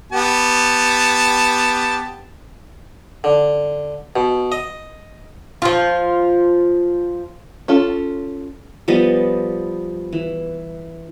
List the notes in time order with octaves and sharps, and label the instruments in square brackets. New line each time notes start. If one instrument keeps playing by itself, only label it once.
[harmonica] B3 G4 A5
[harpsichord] D3
B2
D#5
[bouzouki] F3 F4
[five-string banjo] C#4 F4 A4
[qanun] F3 G3 B3 D#5
E3